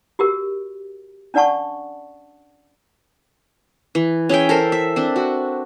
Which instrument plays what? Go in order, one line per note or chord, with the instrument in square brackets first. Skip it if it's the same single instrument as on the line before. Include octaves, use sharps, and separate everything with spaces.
[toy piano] F#4 G4 A#4
C#4 D4 D5 F#5 A5 C#6
[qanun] E3
C#4 G#4 E5 G5
A4 A#4 C5
E5
C4 D4
F#4